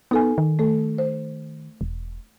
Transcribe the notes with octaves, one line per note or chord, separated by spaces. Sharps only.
B3 D#4 A4 G#5
D#3
A3 A4
C5
E1